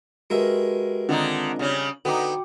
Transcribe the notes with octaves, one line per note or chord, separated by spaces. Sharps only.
G#3 F#4 G4 A#4 B4 E5
D3 D#3 C4 D4 D#4 F4
C#3 G3 C#4
D3 B3 D#4 F#4 G5 D6